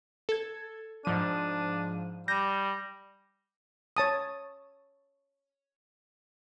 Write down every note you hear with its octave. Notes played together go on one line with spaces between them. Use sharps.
A4 G#6
G#2 F3 D4 D#7
G3 G6 A#6
C#5 A5 D#6